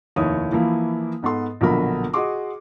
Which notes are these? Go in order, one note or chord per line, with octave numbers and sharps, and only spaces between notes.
F1 D#2 E4 C#5 D#6
E3 F3 A#3 E4
G#2 B3 A4 C6
A#1 B2 D3 F#3 A#4 B5
F#4 G#4 D#5 C6 D6